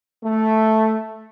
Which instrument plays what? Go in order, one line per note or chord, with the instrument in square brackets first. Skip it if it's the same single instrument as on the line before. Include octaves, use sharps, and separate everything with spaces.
[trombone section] A3